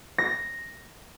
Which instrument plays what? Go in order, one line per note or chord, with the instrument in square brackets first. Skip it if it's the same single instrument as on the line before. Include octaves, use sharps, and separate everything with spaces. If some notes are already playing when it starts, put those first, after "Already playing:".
[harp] A#6